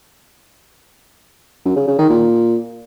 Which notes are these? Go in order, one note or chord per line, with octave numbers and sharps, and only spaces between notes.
F#2
C#3
C#3
D#3
A#2